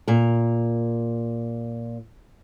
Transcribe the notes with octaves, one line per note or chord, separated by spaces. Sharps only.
A#2 A#4